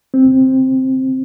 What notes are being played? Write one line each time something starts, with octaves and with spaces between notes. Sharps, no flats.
C4